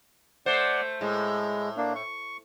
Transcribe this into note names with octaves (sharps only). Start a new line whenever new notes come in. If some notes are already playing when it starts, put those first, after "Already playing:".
A3 C5 D5 F#5
A2 G#3
A#3 D4
C#6